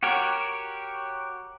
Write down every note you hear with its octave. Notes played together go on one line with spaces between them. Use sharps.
F#4 G4 A#4 C#5